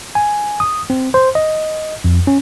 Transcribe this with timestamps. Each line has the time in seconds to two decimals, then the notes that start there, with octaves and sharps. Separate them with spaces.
0.15 G#5
0.60 D#6
0.90 C4
1.14 C5
1.35 D#5
2.04 F2
2.27 C#4